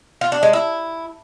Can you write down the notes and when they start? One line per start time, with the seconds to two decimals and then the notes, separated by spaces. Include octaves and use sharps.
0.21 F4
0.32 D4
0.43 G#3
0.53 E4